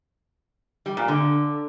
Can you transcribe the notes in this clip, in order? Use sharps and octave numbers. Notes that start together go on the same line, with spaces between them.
G3
A#2
D3